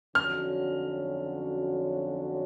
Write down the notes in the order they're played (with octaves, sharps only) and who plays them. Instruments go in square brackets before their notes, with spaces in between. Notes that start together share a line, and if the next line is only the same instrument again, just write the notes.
[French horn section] F2 D3 F#3 C#4 F#4 [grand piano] F6